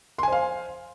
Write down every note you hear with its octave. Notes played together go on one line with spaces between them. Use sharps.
C5 F5 G#5 C6